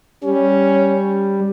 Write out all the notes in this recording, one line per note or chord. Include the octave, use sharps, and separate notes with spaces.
G3 C#4